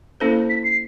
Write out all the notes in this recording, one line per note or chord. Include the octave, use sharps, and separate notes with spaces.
A#3 C#4 E4 A4 C5
B6
C7